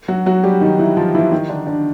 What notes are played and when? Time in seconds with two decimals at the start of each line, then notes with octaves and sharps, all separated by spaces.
0.08 F#3 F#4
0.26 F#3 F#4
0.43 G3 G4
0.61 D#3 D#4
0.79 E3 E4
0.97 F3 F4
1.14 E3 E4
1.32 D#3 D#4
1.49 D3 D4
1.67 D3 D4